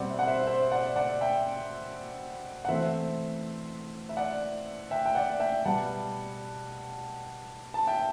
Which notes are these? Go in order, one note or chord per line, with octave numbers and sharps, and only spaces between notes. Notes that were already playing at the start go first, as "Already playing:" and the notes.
Already playing: B2 G3 C4 D5 F#5
E5
F#5
C5 E5
C5 E5
D5 F#5
D5 F#5
E5 G5
F#5
E3 A3 C4 C5 E5
E5
D5 F#5
E5 G5
G5
D5 F#5
E5 G5
B2 G3 B3 F#5 A5
A5
E5 G5